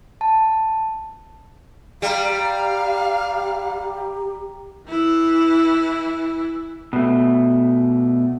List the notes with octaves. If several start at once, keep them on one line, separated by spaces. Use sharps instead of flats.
A5
G3 G4 F5 G5 A#5
E3 E4
B2 A3